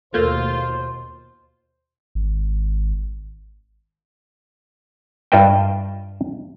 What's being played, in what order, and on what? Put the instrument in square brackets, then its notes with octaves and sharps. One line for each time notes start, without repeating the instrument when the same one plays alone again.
[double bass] D#2 B2 [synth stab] A3 A#3 [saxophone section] F4 [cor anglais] C5
[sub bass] G#1
[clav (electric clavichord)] G2 F4 B4 D#5 E5 G5